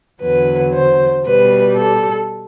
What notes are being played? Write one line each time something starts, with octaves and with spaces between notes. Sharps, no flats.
E2 D3 F#3 B4
C5
B2 G3 B4
A4